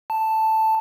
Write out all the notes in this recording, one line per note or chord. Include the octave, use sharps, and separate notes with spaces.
A5